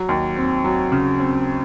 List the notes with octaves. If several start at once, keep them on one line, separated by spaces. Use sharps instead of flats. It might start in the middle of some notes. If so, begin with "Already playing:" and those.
Already playing: F#3
D#2
C4
F#3
C#3
C4